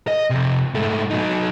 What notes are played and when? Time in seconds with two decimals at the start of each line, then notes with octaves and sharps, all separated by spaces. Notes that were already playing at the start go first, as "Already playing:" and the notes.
0.08 D#5
0.30 F2 C3
0.74 G#2 A3
1.10 F#3 D#4